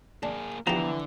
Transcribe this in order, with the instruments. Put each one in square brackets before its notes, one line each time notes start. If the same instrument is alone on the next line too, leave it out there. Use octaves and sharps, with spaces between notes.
[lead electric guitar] A#3 G#4 [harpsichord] D4
[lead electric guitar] D3 [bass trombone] E3 [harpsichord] F3 G4 [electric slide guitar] B3 C5 A#5